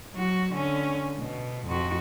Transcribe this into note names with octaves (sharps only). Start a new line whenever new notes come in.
F#3 F#4
D3 C#4
B2
F2 F#4